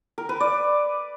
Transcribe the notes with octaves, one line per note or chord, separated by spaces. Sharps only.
A#4
B4
D5